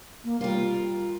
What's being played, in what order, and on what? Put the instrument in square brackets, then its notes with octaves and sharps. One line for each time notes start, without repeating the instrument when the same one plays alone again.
[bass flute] A#3
[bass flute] G3 [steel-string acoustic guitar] F4 A#4